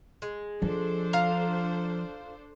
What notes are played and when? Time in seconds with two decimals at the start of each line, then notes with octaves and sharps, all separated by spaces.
0.22 G#3
0.62 F3 D4 A4 C5
1.13 F4 F5 A#5